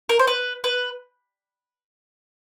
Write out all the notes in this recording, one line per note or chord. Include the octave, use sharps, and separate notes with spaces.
A#4
C5
B4
B4